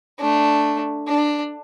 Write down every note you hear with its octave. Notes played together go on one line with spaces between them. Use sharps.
A3 D4
D4